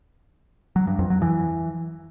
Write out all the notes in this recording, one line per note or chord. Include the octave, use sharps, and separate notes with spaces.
F#3
G2
F2
F#3
E3